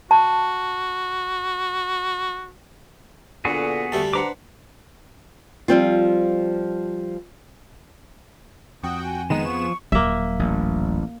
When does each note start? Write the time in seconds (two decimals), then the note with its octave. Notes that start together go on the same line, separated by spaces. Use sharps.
0.11 F#4 A5
3.45 A#2 D3 B3 F#4 G#4
3.92 D2 G3 A3 A5
4.13 D4 B4 C5 F#5 A#5 D6
5.68 F3 G3 C4 F4
8.83 F2 F#4 G5 D#6
9.05 G#5
9.30 D#3 G#3 B3 D#4 G#4 E7
9.45 F3 C#6
9.92 D#1 F#3 A#3 E5
10.39 A1